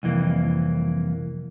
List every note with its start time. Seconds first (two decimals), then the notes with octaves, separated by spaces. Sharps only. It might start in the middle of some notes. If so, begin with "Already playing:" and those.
0.03 C2 F2 E3 A#3